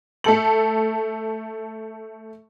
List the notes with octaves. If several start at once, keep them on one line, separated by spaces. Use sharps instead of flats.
A3 A4 F#7